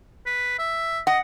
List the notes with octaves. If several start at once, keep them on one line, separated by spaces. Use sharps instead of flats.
B4
E5
D#5 F#5